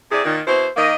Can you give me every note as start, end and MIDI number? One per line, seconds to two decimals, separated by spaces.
0.10 0.23 48
0.10 0.23 64
0.10 0.23 68
0.10 0.23 74
0.24 0.39 46
0.24 0.39 51
0.46 0.66 47
0.46 0.66 64
0.46 0.66 72
0.77 0.93 51
0.77 0.93 58
0.77 0.93 75